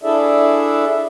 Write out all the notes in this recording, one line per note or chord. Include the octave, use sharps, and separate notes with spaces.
D4 E4 G#4 A4 D5 E5